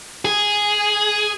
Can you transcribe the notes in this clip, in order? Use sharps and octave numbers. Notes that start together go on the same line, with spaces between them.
G#4